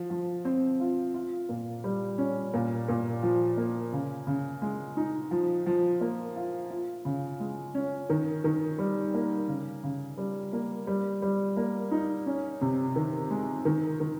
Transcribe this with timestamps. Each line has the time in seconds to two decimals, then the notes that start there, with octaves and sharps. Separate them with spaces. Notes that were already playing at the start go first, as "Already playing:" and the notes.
Already playing: F3
0.10 F3
0.45 C4
0.80 F4
1.14 F4
1.49 A#2
1.84 G3
2.18 C#4
2.54 A#2
2.88 A#2
3.23 F3
3.57 A#3
3.92 C#3
4.27 C#3
4.62 G#3
4.97 D#4
5.31 F3
5.66 F3
6.01 A#3
6.36 F4
6.70 F4
7.05 C#3
7.40 G#3
7.75 C#4
8.10 D#3
8.44 D#3
8.78 G3
9.14 A#3
9.48 C#3
9.83 C#3
10.18 G3
10.53 A#3
10.87 G3
11.22 G3
11.57 A#3
11.91 D#4
12.26 C#4
12.61 C3
12.96 D#3
13.31 G#3
13.65 D#3
14.00 D#3